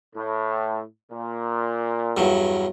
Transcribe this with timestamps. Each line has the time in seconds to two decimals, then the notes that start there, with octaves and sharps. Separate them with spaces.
0.15 A2
1.11 A#2
2.17 E2 G2 F#3